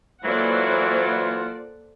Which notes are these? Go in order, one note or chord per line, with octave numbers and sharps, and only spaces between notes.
E3 F#3 A#3 F4 A4 C5 D5 F#5